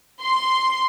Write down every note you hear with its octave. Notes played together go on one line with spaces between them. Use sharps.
C6